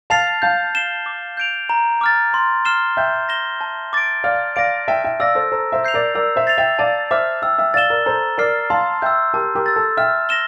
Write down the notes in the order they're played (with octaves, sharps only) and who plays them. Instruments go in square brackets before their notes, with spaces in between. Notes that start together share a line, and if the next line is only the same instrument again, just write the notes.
[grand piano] F5 A5 [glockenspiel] F6 A6 C7 F7
[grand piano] F5 A5 [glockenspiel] G6
[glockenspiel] C7 E7 G7
D6
G6 D7 F7
A#5
D6 F6 A6
C6
F6 C7 E7 G7
[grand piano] E5 G5 [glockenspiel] G6
[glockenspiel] A#6 E7 G7
A5
D6 A6 D7
[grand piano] D5 F5 [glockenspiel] F6
[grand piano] D5 F5 [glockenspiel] A#6 D7
[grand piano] E5 G5 [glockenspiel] A5
[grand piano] E5 G5
[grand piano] D5 F5 [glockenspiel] E6 A#6
[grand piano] A4 C5
[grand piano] A4 C5 [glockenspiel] A#5
[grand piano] C5 E5
[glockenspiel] E6 G6 C7 F7
[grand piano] A#4 D5
[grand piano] A#4 D5 [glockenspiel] E6
[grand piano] C5 E5
[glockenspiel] A6 C7 F7
[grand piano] E5 G5
[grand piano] D5 F5 [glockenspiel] A5
[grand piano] C5 E5 [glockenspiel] D6 F6
[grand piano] E5 G5 [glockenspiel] E6
[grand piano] E5 G5
[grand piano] D5 F5 [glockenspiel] A6 E7 G7
[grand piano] A#4 D5
[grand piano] A4 C5 [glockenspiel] A#5
[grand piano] A#4 D5 [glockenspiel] F6 C7
[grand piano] F5 A5 [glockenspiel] C6
[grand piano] E5 G5 [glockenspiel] E6 G6
[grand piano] G4 A#4 [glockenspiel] A5
[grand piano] G4 A#4
[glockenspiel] E6 A6
[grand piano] A4
[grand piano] E5 G5 [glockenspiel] F6
[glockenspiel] A#6 E7 G7